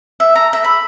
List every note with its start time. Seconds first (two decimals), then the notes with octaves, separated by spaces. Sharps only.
0.20 E5
0.36 A#5
0.53 E5
0.64 B5